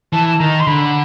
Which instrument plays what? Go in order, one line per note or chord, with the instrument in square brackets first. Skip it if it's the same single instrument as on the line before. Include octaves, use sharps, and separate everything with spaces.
[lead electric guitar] E3 [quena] A5
[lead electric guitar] D#3 [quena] A#5
[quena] C6
[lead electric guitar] D3 [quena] B5